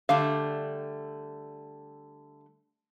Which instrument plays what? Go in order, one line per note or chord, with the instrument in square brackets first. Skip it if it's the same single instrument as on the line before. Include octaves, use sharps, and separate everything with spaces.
[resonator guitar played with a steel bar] D3 G3 A3 [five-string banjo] F5